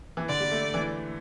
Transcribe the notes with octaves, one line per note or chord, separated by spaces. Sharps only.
E3
D3 D5
G3
A3
E3